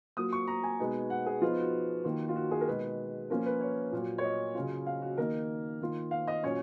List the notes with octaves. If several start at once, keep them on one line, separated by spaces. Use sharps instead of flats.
F#3 A#3 F4 D#6
C#6
A#5
G#5
B2 G#3 B3 D#4
F#5
G#4
F3 B3 D#4 F4
F#4
D#3 A#3 F4
F4
F#4
G#4
A#4
B2 G#3 D#4 B4
F3 A#3 C#4 F4 A#4
B4
C#5
A#2 F#3 A#3
C#5
D#5
C#3 F#3 C#4 F4
F5
F#4
D#3 A#3 D#4 A#4
D#3 A#3 F4
F5
D#5
A#2 F#3 C#4 C#5